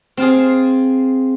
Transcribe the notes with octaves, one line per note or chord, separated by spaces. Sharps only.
C4 F4 G#4